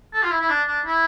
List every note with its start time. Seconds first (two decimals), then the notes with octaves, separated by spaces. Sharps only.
0.14 A4
0.23 F4
0.31 E4
0.41 E4
0.49 D4
0.67 D4
0.85 E4